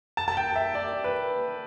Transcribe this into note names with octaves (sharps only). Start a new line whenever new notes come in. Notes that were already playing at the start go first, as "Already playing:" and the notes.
A5
A5
G5
E5
D5
B4